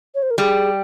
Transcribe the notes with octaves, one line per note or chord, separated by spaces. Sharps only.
C#5
C5
A#4
G3 G#4